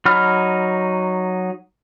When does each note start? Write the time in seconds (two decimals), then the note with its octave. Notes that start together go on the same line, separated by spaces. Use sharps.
0.06 F#3 D#4 B5 F6